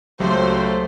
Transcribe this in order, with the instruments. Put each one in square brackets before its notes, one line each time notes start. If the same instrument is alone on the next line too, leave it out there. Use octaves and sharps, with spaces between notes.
[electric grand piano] C#2 [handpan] F#3 G4 [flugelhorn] A3 [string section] C5